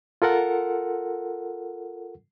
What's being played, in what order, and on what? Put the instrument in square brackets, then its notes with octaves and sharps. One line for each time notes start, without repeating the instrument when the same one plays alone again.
[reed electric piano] F4 A4 A#4 F#5